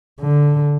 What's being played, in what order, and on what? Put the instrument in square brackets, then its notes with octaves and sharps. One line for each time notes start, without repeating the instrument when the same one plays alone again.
[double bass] D3